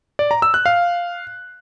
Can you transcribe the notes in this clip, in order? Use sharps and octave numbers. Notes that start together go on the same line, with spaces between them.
D5
A#5
E6
F#6
F5